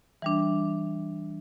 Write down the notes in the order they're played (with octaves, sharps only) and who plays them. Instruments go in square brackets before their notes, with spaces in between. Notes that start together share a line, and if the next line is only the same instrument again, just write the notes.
[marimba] E3 G3 D4